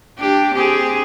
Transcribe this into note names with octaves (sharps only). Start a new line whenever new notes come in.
D4 G4
C4 G4 G#4